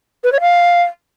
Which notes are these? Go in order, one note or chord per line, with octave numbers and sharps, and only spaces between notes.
B4
C#5
F5